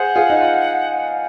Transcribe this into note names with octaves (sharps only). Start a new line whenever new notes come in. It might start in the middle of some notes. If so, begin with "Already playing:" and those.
Already playing: G#4 C5 F#5
F4 G#4
D#4
F4